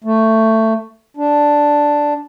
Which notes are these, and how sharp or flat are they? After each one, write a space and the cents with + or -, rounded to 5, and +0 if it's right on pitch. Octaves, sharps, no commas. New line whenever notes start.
A3 +15
D4 +0